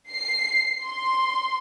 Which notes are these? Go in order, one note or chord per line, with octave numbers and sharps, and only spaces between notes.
C7
C6